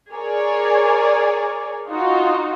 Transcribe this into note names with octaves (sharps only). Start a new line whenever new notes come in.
G#4 A#4 C#5 D5
D#4 F4 F#4